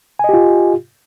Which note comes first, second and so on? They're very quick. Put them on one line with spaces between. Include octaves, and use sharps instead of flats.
G#5 D#5 G4 F4